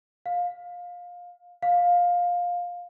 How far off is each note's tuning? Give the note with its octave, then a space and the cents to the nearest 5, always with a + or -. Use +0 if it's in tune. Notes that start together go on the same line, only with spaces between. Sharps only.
F5 +20
F5 +15